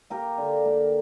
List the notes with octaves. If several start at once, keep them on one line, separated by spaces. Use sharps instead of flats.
A#3 G4 A#4
D3
A#3